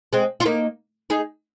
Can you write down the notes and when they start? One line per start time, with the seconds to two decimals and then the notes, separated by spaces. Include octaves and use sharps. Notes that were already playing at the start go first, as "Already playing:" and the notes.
0.13 G#3 C4
0.40 F4
0.45 A#3 D#4
1.10 D#4 G#4